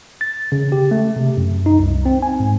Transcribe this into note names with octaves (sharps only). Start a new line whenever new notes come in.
A6
C#3
G4
A3
C3
F#2
D#4
C2
C4
G#5
G#2